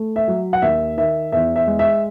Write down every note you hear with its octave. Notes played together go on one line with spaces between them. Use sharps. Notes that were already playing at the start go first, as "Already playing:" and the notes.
Already playing: A3
E5
F#3
F#5
D#2 E5
D#3 E5
E2 E5
E5
G#3
E5